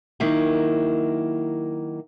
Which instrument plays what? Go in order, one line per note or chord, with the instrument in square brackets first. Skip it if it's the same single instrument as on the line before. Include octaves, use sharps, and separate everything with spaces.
[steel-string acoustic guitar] D#3 F#3 A#3 E4